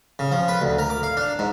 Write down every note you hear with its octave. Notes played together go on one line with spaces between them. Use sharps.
C#3
F3
B4
D2
A#4
D6
F5
D4
G#2